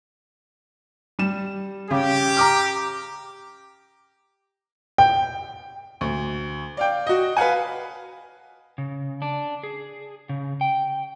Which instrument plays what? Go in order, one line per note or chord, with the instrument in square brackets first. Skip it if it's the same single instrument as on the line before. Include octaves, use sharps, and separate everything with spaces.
[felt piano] G3 E7
[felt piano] C#3 [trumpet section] G4
[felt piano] A#5 D6 F6
[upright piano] G5
D2
D5 F5 G5
F#4 D#5
B4 F5 F#5 G#5
[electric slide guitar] C#3
D4
G#4
C#3
G5